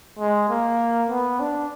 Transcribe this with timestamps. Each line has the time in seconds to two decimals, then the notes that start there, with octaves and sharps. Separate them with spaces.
0.19 G#3
0.49 A#3
1.10 B3
1.40 D4